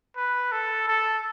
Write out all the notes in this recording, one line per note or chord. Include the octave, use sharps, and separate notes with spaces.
B4
A4
A4